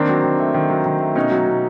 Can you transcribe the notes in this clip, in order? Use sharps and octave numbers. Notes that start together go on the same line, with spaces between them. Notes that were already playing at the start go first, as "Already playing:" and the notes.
Already playing: D#3 A#3 C4 D4
F#3
D#3
A3
D#3
F#3
D#3
A3
B2 C#4 D#4
F#3
B2